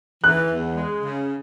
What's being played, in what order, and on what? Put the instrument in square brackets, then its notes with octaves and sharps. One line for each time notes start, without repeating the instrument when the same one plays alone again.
[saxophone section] E3 [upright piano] F#6
[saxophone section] E2
G#3
C#3